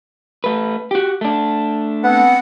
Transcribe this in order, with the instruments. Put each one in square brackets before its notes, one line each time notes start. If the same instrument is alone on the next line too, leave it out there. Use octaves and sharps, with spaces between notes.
[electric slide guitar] A3 B4
F#4 G4
A3 D4
[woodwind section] B3 C4 F#5